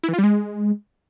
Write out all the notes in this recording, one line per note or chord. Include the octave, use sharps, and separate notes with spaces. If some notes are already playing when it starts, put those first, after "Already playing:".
E4
E3
F4
G3
G#3